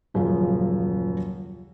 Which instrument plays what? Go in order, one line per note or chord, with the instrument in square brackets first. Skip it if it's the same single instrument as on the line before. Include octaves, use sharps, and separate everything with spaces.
[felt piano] D#1 F#2 C#3 F3 F5